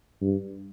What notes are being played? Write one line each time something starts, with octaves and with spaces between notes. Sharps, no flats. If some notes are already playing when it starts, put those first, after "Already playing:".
G2